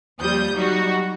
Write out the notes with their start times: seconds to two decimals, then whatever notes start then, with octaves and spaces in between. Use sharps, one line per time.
0.20 D#2 F3 G3 D#6 G6
0.52 F#3 G3 D#4 F#4